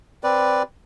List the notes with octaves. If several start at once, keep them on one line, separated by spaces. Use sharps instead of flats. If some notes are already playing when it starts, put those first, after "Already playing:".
C4 B4 D5